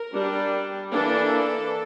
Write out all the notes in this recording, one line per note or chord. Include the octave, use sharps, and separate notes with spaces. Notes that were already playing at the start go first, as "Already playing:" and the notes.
Already playing: A#4
G3 D4
E3 A#3 D4 A4